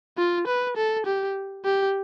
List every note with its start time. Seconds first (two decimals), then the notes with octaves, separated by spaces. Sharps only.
0.18 F4
0.47 B4
0.77 A4
1.06 G4
1.65 G4